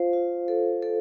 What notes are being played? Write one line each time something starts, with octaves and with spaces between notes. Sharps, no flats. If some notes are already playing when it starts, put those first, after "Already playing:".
Already playing: F4 C5 F5
F4
A4
A4